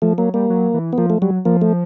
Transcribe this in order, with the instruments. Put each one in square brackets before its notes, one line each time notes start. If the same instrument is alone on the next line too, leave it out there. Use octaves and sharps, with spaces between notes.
[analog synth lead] F3 [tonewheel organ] A3
[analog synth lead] F#3 [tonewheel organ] A#3
[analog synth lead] G3 [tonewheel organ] A#3
[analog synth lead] F#3
E3
[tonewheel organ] B3
[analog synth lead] F3 [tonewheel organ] A#3
[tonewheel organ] A3
[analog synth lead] F#3 [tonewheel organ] G3
[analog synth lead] F3 [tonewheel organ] A#3
[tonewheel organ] A3